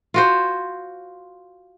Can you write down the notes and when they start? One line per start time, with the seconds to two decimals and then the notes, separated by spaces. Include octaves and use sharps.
0.14 F4 F#4 C5